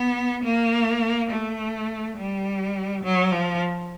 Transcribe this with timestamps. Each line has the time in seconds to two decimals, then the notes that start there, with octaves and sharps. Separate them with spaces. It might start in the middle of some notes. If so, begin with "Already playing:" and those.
Already playing: B3
0.44 A#3
1.30 A3
2.17 G3
3.04 F#3
3.32 F3